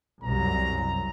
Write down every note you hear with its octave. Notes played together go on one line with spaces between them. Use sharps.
C2 F#2 A#5